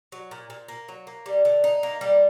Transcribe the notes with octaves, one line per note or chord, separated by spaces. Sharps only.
F#3
A#2
A#2
A#3
F#3
A#3
G3
D3
D#4
A#3
G3